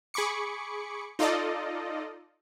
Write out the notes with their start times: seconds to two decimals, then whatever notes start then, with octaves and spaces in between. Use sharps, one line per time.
0.14 G#4 B5 C#6 D6 C#7
1.19 D#4 F4 A4 D5 D#5